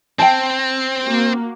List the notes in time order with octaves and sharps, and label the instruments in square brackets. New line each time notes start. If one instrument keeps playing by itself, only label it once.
[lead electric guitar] C4 [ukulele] G5 A5
[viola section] A#3 F#4